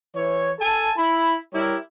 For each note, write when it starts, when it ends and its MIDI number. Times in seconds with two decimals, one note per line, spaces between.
0.16 0.52 52
0.16 0.52 73
0.60 0.92 69
0.60 0.92 80
0.60 0.92 81
0.98 1.36 64
0.98 1.36 83
1.54 1.76 55
1.54 1.76 64
1.54 1.76 67
1.54 1.76 70
1.54 1.76 73